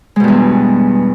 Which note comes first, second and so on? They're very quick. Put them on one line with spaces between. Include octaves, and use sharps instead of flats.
G#3 B2 G2 E2